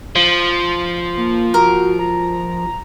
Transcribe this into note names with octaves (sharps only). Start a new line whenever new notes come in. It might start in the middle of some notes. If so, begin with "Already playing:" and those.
F3
A#3
F#4 A#4
A#5